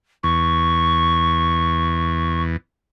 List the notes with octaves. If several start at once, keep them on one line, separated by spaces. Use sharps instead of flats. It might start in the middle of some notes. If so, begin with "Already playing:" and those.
E2 C#6